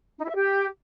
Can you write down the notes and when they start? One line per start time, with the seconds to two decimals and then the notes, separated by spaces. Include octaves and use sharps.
0.18 D#4
0.24 E4
0.29 E5
0.34 G4